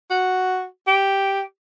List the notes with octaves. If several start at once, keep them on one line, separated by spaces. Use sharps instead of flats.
F#4
G4